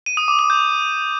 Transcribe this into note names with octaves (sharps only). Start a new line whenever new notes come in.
D#7
D#6
D6
D#6
G6